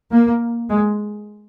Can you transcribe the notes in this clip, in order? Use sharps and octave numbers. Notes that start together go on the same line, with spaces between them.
A#3
G#3